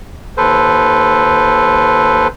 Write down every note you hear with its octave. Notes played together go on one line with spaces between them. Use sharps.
D#2 A4 B4 C5